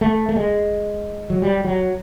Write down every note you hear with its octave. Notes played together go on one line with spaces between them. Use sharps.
A3
A3
G#3
F#3
G3
F#3